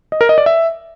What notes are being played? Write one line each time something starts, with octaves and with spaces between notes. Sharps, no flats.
D#5
A#4
D#5
D5
E5